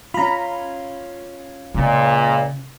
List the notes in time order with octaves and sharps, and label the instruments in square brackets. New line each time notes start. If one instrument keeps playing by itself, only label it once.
[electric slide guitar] C#4 F4 [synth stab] A#5 B5
[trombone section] C#2 A#2 [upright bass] C#3